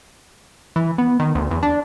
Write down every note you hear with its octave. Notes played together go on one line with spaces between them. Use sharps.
E3
B3
D#3
D2
E2
D4